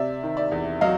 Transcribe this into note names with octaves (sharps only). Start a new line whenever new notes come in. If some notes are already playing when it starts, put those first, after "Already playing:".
Already playing: C3 D5 E5
D#3
D5 E5
E2
F#3 D#5 F5